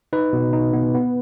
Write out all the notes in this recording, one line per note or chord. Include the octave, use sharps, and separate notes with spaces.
D#4 B4
B2
D#4
B3
B3